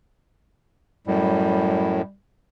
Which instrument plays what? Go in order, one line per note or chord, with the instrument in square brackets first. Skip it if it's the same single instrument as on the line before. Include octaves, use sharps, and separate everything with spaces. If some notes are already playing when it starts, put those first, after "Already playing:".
[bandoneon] F#2 A2 [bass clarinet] G3